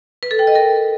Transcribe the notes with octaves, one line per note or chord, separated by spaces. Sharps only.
B4
A4
G5
D#5
A#4